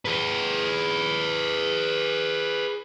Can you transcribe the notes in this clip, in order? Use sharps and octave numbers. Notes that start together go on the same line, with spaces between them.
G#4 B4